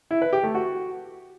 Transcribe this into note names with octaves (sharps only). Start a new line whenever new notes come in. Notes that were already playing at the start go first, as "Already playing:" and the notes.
E4
B4
G4
A3
F#4